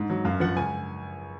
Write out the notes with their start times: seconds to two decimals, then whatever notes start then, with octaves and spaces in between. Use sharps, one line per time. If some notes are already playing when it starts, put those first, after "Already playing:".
Already playing: G#2
0.10 F#3
0.25 F#2 F5
0.40 F3 F#5
0.56 C#2 G#5